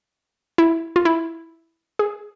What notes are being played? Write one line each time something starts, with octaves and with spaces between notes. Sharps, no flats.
E4
F4
E4
G#4